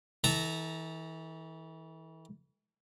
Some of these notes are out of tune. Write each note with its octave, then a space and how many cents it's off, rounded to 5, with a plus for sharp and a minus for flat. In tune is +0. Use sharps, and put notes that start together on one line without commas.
E3 -35 A4 +0 A#5 -5